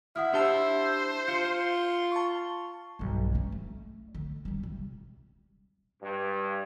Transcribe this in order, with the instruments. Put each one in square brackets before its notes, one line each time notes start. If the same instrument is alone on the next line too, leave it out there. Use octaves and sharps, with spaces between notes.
[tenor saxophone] E4 [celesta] F#5 D#6 F6
[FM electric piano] D4 A5 E6 [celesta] G4 G7 [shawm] C5
[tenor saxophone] F4 [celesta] C7 [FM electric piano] C#7
[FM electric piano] A5 C#6
[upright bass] B1 G2
A3 C#4
A3
D3
G3 C#4
C3
[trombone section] G2